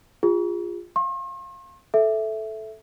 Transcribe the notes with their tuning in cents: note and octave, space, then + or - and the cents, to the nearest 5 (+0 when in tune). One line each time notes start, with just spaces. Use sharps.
F4 +0 G#4 -35
F5 +0 C6 +45
A4 -10 E5 +0